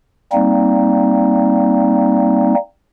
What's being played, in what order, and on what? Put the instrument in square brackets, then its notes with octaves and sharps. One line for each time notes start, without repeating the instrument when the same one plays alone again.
[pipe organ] G3 A#3 C4 D#4